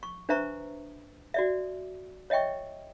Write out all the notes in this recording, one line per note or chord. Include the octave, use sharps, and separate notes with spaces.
C#6
D4 B4 C5 E5 A#5 C#6
F#4 D5 E5
C#5 D#5 E5 G5 C#6